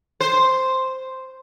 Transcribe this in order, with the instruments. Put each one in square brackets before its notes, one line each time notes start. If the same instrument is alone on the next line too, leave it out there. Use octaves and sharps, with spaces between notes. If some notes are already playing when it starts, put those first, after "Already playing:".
[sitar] C5